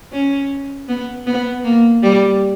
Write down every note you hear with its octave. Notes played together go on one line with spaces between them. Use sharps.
C#4
B3
B3
A#3
G3